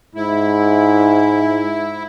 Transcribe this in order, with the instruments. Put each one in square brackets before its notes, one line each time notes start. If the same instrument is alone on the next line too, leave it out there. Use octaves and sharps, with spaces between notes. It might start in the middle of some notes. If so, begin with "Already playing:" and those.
[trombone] G#2 [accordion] E4